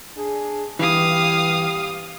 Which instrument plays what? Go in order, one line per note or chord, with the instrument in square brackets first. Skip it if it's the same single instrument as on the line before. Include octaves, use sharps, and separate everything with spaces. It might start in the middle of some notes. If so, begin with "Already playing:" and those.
[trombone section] D4 G#4
[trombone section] G2 B3 G4 [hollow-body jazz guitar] E3 [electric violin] F5 D#6